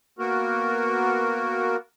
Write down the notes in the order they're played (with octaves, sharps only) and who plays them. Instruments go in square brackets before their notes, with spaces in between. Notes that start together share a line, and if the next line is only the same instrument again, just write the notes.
[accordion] A#3 B3 F#4 A#4